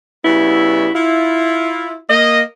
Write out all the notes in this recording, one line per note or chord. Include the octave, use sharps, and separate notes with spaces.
C#3 G3 B3 E4 F#4 E5
E4 F4
A#3 D#5